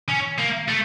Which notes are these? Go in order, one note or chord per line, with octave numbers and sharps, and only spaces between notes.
C#4
A#3
A3